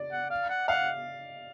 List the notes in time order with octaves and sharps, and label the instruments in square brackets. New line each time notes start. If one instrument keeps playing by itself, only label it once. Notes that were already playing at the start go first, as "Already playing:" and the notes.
Already playing: [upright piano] D5
[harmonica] F#5
F5
F#5
[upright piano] F5 [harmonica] F#5